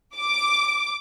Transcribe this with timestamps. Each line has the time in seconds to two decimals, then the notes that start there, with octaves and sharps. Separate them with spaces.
0.16 D6